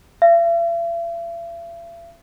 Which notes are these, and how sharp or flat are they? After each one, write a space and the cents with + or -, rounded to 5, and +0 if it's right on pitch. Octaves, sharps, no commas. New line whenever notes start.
E5 +45